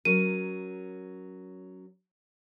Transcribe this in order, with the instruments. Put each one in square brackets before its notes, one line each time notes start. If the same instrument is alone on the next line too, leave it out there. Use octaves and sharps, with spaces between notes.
[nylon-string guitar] F#3 C#4 A#4 [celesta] D#7